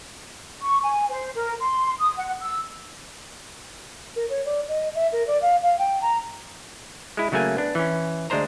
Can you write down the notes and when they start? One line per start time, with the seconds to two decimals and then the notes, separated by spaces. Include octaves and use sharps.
0.62 C#6
0.83 G#5
1.10 C5
1.36 A#4
1.60 C6
2.00 D#6
2.17 F#5
2.42 E6
4.16 A#4
4.29 C#5
4.45 D5
4.68 D#5
4.95 E5
5.12 A#4
5.27 D5
5.42 F5
5.63 F5
5.78 G5
6.02 A#5
7.17 G#3 E4
7.32 C#3 F#3 A3 A#3 G#5
7.57 B3 D4
7.75 E3 C#4
8.30 D2 G#3 D4 C5 A#5